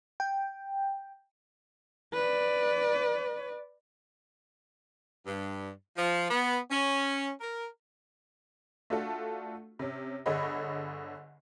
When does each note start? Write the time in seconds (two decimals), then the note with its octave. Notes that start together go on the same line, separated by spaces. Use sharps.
0.20 G5
2.14 B4 D5
5.26 G2
5.97 F3
6.30 B3
6.71 C#4
7.41 A#4
8.90 A3 D4 F4 F#4 A4
9.79 C3 C#4
10.26 G1 D3 G#4 C#5 D#5 B5